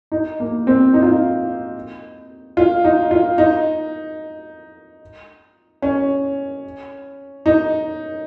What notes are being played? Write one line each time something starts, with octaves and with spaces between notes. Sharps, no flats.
D#4
A#3
C4
D#4
F4
D#4
F4
D#4
F4
D#4
C#4
D#4